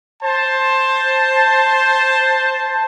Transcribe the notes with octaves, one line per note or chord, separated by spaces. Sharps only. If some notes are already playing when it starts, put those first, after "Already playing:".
C5 A5